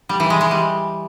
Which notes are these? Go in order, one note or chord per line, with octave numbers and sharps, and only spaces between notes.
G3
E3
G#3
G#3
G3